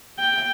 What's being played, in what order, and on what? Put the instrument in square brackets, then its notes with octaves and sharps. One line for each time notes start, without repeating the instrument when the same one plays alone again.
[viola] G5